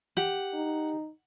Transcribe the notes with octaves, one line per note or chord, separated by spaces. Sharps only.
G4 F#5
D#4